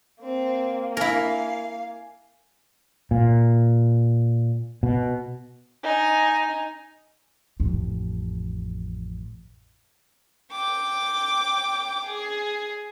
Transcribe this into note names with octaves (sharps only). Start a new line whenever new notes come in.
A#3 C4
E4 A#4 F5 G#5
A#2
B2
D#4 G#5
A1 F2
G5 D6
G#4